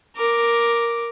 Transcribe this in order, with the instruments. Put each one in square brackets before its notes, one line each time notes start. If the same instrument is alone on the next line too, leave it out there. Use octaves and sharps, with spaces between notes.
[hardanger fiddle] A#4 D6